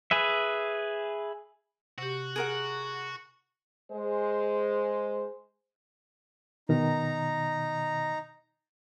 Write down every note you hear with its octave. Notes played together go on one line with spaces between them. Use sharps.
G#4 B4 E5
C3 F#4 G4
G#4 A#4 F#5
G#3 C5
B2 D#3 D#4 A#5